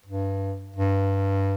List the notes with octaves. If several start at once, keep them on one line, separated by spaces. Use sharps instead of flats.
G2
G2